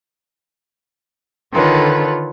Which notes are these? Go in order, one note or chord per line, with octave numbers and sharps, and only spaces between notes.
D3 D#3 F4 A4 B4 C#5